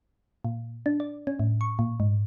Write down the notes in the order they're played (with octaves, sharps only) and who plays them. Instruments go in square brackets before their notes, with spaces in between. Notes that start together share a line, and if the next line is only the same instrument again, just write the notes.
[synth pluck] A#2
D4
D5
C#4
A2
C#6
A#2
G#2